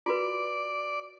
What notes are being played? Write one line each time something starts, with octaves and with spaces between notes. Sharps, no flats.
F4 F#4 B4 D5